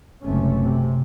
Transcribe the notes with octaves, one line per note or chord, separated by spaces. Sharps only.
F#1 C#2 C3 A3 C#4
C3